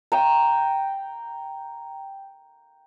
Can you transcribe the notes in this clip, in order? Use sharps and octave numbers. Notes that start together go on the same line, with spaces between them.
G5 A#5